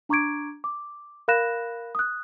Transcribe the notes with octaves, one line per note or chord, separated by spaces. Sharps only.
D4 A#5 C#6 D6 G#6 D7
D6
A#4 F5 B5 F#6 A#6 E7
D#6 F#6